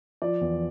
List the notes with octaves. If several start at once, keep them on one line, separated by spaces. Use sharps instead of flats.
F3 D5
E2